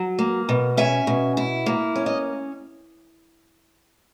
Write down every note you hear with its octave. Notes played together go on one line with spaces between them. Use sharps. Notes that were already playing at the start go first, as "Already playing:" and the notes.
Already playing: F#3
A#3
B2
C#4 E5 G#5
B2
E4
A#3
C#4
D#5